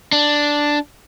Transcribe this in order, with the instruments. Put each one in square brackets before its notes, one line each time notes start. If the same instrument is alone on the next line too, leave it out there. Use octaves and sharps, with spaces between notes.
[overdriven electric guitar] D4